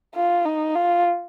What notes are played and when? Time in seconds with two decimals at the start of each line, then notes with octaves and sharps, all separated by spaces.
0.15 F4
0.45 D#4
0.75 F4